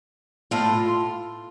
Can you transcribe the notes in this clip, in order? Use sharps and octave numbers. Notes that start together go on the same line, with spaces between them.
A2 F4